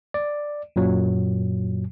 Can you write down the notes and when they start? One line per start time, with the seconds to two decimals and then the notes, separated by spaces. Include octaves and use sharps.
0.14 D5
0.76 F#2 A#2 F#3